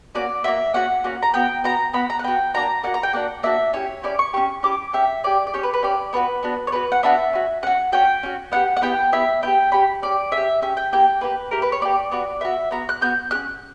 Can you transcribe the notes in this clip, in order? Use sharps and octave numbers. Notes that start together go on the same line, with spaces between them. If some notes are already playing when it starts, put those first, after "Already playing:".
A#3 C#4 F#4 D5
A#3 C#4 F#4 E5
A#3 C#4 F#4 F#5
A#3 C#4 F#4
A#5
B3 F#4 G5
B3 F#4 A#5
B3 F#4 B5
A#5
F#5
B3 F#4 G5
A#3 D4 F#4 A#5
A#3 D4 F#4 F#5
A#5
G5
A#3 D4 F#4 F#5
A#3 D4 F#4 E5
C#4 E4 G4 C#5
C#4 E4 G4 D5
C#6
C#4 E4 G4 C#6
C#4 E4 G4 D6
C#4 G4 E5
C#4 G4 D5
D5
C#4 G4 C#5
B4
B4
C#4 G4 D5
B3 D4 F#4 B4
B3 D4 F#4
C#5
B3 D4 F#4 B4
F#5
B3 D4 F#4 E5
C#4 F#4
C#4 F#4 F#5
C#4 F#4 G5
C#4 F#4
B3 E4 G4 F#5
F#5
B3 E4 G4 G5
B3 E4 G4 E5
B3 E4 G4 G5
C#4 G4 B5
C#4 G4 D5
C#4 E5
G4
C#4 G4 E5
G5
A#3 E4 G4 G5
A#3 E4 G4 B4
A#3 E4 G4 A#4
B4
C#5
A#3 E4 G4 D5
B3 F#4 D5
B3 F#4 E5
B3 F#4 A#5
F#6
B3 F#4 G6
C#4 G4 F#6